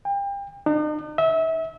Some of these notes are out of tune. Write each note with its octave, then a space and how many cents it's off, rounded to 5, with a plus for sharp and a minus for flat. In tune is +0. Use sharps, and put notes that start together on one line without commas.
G5 +30
D#4 -45
E5 -30